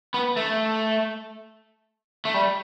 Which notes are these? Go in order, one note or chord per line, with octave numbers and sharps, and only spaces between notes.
B3
A3
A3
G3